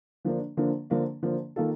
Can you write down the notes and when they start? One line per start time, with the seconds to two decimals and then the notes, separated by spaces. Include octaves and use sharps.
0.25 D3 F3 A#3 D4
0.57 D3 F3 A#3 D4
0.90 D3 F3 A#3 D4
1.23 D3 F3 A#3 D4
1.56 D#3 A#3 F4 A4